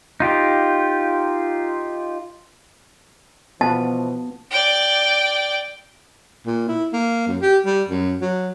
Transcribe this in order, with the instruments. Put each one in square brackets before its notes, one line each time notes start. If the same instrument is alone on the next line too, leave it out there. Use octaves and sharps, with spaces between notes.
[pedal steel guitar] D#4 F4 G4
[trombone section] B2 E3 F3 [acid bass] B3 [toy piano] A5
[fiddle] D5 G5
[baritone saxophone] A#2
E4
A#3
F#2
G4
G3
F#2
F#3